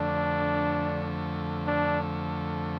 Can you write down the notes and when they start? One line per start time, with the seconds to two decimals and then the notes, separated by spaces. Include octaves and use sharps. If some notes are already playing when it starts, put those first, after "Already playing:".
Already playing: F2 D3 A3 D4
1.67 D4